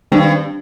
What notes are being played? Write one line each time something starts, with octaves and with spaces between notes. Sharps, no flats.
G2 D#3 G3 C4